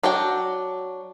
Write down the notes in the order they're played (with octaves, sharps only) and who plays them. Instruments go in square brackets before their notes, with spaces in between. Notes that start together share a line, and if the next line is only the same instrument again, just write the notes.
[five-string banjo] F#3 D4 F#4 G5